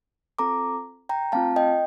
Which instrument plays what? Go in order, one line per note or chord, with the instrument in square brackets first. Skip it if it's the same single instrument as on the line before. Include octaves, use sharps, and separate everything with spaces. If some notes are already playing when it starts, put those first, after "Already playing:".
[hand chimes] C4 F4 A4 A#5 D6
G5 A#5
A3 C4 F4 F5 A5
D#5 G5